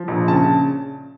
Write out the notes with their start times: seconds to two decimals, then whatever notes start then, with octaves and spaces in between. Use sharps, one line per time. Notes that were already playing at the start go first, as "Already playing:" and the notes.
Already playing: F3
0.08 A#1
0.28 C#3 A5